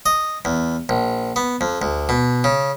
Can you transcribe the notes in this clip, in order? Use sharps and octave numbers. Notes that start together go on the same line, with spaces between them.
D#5
E2
A#1
B3
F2
D2
B2
C#3